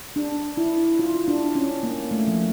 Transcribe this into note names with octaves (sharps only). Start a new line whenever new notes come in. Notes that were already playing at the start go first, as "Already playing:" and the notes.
D4
E4
F4
D4
C#4
A#3
A3
F3